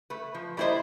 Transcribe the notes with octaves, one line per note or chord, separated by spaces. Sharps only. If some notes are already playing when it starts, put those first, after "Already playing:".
A3 B4
F3
G3 A#3 E4 F#4 C5 D#5